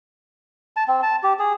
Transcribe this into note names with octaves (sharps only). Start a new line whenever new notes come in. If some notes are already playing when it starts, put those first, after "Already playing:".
A5
C4
A5
G4
G#4